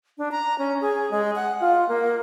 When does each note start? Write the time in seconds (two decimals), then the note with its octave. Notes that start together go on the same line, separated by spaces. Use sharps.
0.18 D4
0.32 A#5
0.58 C#4
0.81 G#4
1.11 G#3
1.36 F#5
1.60 F4
1.89 A#3